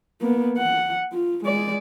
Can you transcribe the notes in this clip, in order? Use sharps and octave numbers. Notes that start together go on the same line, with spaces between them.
A#3 B3
F#5
F4
G#3 D5